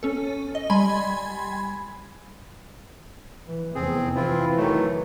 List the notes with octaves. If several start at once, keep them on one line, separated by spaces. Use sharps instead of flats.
C#4 A4
D#5
G3 G#5 B5 C6 G#6
E3
F1 E2 C4 G#4
E3 C4 E4 F4
D#3 F#3 A3